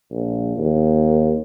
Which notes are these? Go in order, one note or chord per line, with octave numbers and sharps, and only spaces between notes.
A#1
D#2